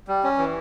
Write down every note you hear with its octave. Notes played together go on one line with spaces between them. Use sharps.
G3
C#4
E3